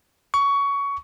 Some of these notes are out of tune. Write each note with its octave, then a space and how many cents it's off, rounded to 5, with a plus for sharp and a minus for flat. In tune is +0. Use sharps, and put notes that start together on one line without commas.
C#6 +20